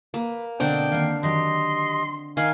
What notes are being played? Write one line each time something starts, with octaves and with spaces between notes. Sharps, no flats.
A#3 B4
B2 D3 C4 D4 A4 D#5 G5
D#3 A#3 F5
D#3 F#3 G4 D#5 C6
D#3 D#5 F5 G#5 B5